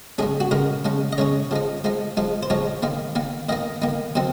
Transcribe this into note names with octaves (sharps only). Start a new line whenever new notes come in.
C#3 G#3 C#4 G#4
F#4
C#3 G#3 C#4 A#4
C#3 G#3 C#4
D#5
C#3 G#3 C#4 C#5
F3 G#3 D#4
F3 G#3 D#4
F3 G#3 D#4
C5
F3 G#3 D#4 C#5
D#3 A#3 D#4
D#3 A#3 D#4
D#3 A#3 D#4 D#5
D#3 A#3 D#4
D#3 F#3 C4 D#4